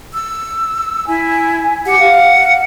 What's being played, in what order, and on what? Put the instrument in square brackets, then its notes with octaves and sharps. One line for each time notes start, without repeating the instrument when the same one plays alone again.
[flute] E6
[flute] E4 [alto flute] G#5
[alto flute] G4 [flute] F#5
[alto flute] F5